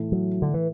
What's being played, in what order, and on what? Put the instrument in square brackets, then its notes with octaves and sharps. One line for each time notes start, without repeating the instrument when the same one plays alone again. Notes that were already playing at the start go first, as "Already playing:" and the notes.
Already playing: [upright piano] A2 E3 A3
[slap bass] F#3
D3
E3